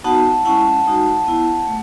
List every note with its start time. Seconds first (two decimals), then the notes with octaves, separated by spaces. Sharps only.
0.04 B3 D#4 F#4 F#5 A5
0.45 G#3 C#4 E4 F#5 A5
0.86 G#3 D#4 F#4
1.27 B3 E4
1.67 A3